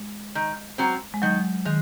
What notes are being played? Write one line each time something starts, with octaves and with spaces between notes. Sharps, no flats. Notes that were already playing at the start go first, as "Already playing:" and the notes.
Already playing: G#3
D#3
F#3 C4
G#3
D#3 F#3
D#3 G#3